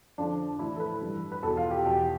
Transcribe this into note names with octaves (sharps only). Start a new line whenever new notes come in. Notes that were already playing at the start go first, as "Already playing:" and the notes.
F2 D3 F3 D4
A2 E3 E4
A4
B4
G2 E3
B4
E2 B2 A4
F4
G4
E2 B2 G4